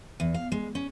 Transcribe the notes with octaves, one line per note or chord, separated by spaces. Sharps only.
E2
F5
G#3
C#4